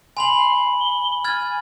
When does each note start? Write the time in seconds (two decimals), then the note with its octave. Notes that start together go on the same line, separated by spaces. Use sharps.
0.17 G#5 B5 C6 F#7
0.80 G7
1.24 G#5 F6 G#6 A6